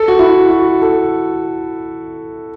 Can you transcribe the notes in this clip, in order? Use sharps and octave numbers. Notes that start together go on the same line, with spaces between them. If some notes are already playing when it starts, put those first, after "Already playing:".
Already playing: A4
F#4
E4
F#4
A4